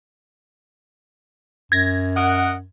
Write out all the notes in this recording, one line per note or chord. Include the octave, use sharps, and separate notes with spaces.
F#2 G#6 A#6
A#4 D#5 F#5